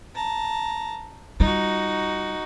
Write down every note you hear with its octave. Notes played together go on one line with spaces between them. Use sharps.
A5 A#5
G3 D#4 F4 F#4